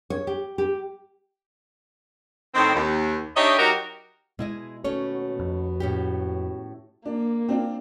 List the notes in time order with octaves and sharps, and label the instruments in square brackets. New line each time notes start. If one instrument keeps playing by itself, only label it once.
[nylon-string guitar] C#5
G4
G4
[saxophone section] A2 D#3 C4
D#2
D4 D#4 G4 C#5 D#5 E5
F#3 D#4 F#4 G4 A#4
[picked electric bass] B2 [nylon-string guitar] G#3 E4 D#5
[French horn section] D#2 B3 F#4 [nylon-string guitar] A3 C#4 C#5
[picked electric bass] F2
[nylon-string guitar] A2 C#4 G4
[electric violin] A#3 [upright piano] D4
[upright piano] C4 D4 F4